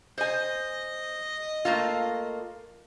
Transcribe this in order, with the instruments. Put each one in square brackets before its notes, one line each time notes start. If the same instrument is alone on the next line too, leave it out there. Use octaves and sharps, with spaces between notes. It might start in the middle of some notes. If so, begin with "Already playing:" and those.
[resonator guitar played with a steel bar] C5 G#5 [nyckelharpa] D#5
[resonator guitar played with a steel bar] A3 A#3 F4